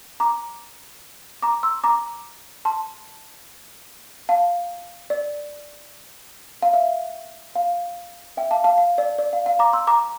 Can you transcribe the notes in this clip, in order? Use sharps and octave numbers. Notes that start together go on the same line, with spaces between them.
A#5 D6
A#5 D6
C6 E6
A#5 D6
A5 C6
F5 A5
D5
F5
E5
F5
E5 G5
F5 A5
F5 A5
F5
D5
D5
F5
F5
A#5 D6
C6 E6
A#5 D6